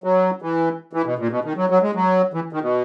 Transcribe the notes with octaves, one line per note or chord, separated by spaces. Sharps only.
F#3
E3
E3
B2
A#2
B2
D#3
F#3
F#3
G#3
F#3
E3
D#3
B2